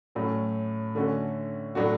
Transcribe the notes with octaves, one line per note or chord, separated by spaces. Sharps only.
A2 F#3 C#4
D3 A3 C#4 F#4
A2 F#3 A3 D4 F#4